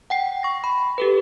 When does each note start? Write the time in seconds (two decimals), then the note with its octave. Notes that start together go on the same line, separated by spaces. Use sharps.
0.10 F#5 G5 C7
0.43 C#6 A#6
0.64 B5
0.98 G4 A4 B4